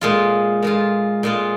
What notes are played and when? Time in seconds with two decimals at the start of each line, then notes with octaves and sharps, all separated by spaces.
0.01 A#2 G#3 F4
0.63 A#2 G#3 F4
1.23 A#2 G#3 F4